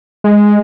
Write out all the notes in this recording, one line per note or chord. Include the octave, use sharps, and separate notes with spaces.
G#3